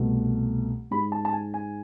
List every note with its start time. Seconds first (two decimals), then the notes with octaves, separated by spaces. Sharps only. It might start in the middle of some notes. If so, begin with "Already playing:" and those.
Already playing: C2 B2 A3
0.91 G#2 G#3 B5
1.12 A5
1.25 A5
1.33 G#5
1.54 G#5